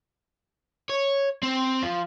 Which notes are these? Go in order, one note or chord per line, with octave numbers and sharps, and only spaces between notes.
C#5
C4
F3